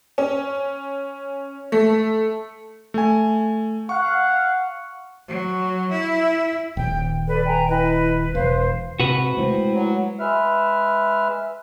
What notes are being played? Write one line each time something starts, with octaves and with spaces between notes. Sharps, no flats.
C#4
A3
A3 G#5
F5 F#5 C#6
F#3
E4
D#1 G5
A4 B4 D5
G5 G#5 A#5
E4 B4 D#5
E1 B4 C5 F5
G#2 C3 F#4 B4
G#3 A3 C4 E4
F#3
G#3 B4 E5 F6